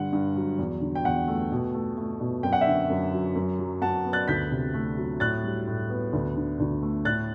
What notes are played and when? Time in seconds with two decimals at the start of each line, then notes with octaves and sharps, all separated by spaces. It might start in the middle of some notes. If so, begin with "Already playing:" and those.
Already playing: G2 D3 G3 F#5
0.13 G2
0.36 F#3
0.58 E2
0.81 D3
0.95 G5
1.05 E2 F#5
1.28 A3
1.52 B2
1.74 A3
1.98 A3
2.20 B2
2.43 F#2 G5
2.53 F#5
2.61 E5 G5
2.67 D3
2.90 F#2
3.13 F#3
3.35 F#2
3.59 F#3
3.81 F#2 F#5 A5
4.05 B3
4.13 F#6 A6
4.28 D2 G6 B6
4.52 C3
4.74 A3
4.97 F#3
5.20 A2 F#6 A6
5.43 G3
5.67 A2
5.89 B3
6.13 D2
6.36 D3
6.60 D2
6.82 A3
7.05 A2 F#6 A6